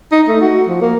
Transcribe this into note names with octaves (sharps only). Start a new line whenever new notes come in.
D#4
A3
F#4
F3
A#3